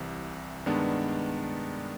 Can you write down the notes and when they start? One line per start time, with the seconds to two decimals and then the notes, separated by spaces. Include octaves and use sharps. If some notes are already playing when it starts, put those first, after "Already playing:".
Already playing: C2 C3 E3
0.66 G2 D#3 G#3 B3 D4